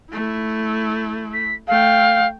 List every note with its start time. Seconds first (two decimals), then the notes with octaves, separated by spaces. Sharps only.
0.12 A3 E4
1.34 B6
1.68 A3 F5 G5